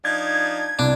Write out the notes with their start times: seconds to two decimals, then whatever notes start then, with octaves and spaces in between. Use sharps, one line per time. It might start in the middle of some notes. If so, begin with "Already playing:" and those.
0.05 F3 D4 D#4 G#6
0.79 C2 D4